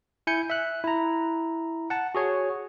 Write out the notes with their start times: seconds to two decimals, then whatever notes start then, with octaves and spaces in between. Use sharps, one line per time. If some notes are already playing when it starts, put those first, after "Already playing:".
0.27 E4 G#5 G6 C#7
0.50 E5 F#6
0.84 E4 A#5
1.90 F#5 A5
2.15 F#4 G#4 C#5